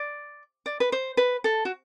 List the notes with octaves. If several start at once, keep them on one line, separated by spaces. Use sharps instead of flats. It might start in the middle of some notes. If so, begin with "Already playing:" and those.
Already playing: D5
D5
B4
C5
B4
A4
F#4